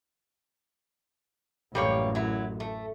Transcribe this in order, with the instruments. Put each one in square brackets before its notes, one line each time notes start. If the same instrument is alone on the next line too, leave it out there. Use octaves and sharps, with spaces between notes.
[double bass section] A1 F#2 [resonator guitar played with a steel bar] G3 A#3 C#5
[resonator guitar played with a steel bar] F#3 E4
A3